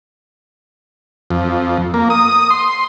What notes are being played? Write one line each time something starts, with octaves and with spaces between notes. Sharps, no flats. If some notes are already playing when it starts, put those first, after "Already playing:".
F2
A#3
D#6
C6